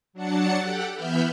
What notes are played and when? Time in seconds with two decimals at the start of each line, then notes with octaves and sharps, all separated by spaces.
0.13 F#3 D4 F#5 A5 C#7
0.59 G4 A4 F#5 G5
0.93 E3 B3 E5 B5 F6 G6